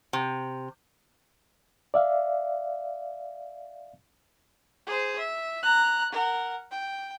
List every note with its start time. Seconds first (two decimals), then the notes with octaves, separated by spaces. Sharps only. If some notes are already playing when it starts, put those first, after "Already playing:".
0.13 C3
1.94 D5 E5 F5
4.87 G#4 C5
5.18 E5
5.63 A#5 F#6
6.12 A#4 F#5
6.71 G5